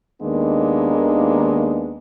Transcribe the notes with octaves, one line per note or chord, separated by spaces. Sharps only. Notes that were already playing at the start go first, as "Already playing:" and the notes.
D#2 D#3 G#3 A#3 B3 D4